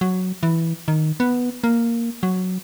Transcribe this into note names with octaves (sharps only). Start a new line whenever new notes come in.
F#3
E3
D#3
B3
A#3
F#3